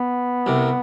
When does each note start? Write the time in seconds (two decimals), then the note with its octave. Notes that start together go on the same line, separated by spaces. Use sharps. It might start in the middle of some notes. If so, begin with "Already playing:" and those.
Already playing: B3
0.46 C2 C3